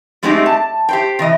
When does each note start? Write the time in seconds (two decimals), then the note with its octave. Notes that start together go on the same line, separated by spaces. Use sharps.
0.23 F#2 G#3 A3 C4 D#4 G4
0.46 A5
0.89 G4 C5 G5
1.19 C3 E3 D#5